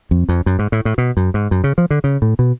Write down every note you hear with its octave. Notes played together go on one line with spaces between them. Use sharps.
F2
F2
F#2
G#2
A2
A2
B2
F#2
G#2
F#2
C#3
F3
D3
C#3
A2
B2